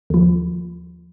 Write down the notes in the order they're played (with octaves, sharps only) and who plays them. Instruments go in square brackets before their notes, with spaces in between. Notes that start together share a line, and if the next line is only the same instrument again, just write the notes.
[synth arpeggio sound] D#2 F3